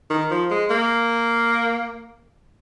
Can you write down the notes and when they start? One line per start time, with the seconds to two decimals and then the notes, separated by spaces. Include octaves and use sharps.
0.10 D#3
0.31 F3
0.51 G#3
0.70 A#3